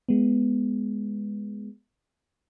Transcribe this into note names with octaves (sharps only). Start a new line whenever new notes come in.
G#3 B3